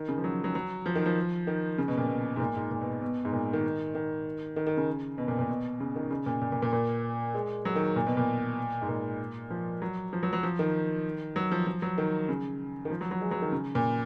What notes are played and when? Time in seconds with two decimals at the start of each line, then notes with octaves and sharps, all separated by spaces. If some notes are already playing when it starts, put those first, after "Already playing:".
Already playing: D#3
0.08 C#3
0.18 F3
0.24 F#3
0.44 F#3
0.55 F#3
0.86 F3
0.95 D#3
1.06 F3
1.47 D#3
1.78 C#3
1.88 B2
1.97 A#2
2.07 B2
2.36 G#2
2.40 A#2
2.56 G#2
2.71 A#2
2.81 B2
3.02 B2
3.25 G#2
3.33 A#2
3.53 D#3
3.95 D#3
4.56 D#3
4.67 D#3
4.77 C#3
5.18 B2
5.28 A#2
5.39 A#2
5.49 B2
5.80 C#3
5.96 D#3
6.10 C#3
6.26 A#2
6.41 A#2
6.52 A#2
6.62 A#2
6.73 A#2
7.34 G#3
7.65 F#3
7.76 D#3
7.96 A#2
8.06 B2
8.17 A#2
8.82 G#2
8.89 A#2
9.50 F3
9.82 F#3
10.13 F3
10.23 F#3
10.33 F#3
10.43 F3
10.59 D#3
11.36 F#3
11.52 F3
11.67 F3
11.82 F#3
11.98 D#3
12.29 C#3
12.85 D#3
12.91 F3
13.01 F#3
13.11 F#3
13.21 G#3
13.31 F#3
13.42 D#3
13.52 C#3
13.75 A#2